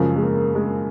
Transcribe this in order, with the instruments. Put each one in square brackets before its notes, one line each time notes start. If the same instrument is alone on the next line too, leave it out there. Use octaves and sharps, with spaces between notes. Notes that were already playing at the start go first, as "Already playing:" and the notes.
Already playing: [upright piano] F#2 C#3 F3 G#3
G#3
A#3
G#3